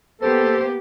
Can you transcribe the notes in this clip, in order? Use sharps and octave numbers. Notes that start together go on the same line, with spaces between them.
A#3 B3 G4 A4 C5